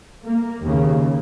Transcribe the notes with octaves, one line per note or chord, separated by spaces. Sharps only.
A#3
D#2 C#3 A#3